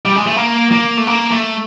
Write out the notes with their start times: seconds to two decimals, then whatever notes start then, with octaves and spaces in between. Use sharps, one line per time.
0.05 G3
0.16 G#3
0.26 A3
0.36 A#3
0.72 A#3
0.97 A3
1.07 A#3
1.31 A3